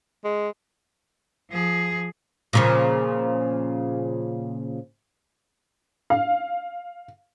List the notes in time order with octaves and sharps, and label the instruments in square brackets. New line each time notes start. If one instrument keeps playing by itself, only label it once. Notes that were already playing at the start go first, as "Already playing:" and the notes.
[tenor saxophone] G#3
[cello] F3 G#4
[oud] A#2 C#3 F3
[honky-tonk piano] F5